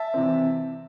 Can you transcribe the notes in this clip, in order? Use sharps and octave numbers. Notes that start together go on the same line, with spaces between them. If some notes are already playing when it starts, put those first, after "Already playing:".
Already playing: E5 A5
C3 E3 C4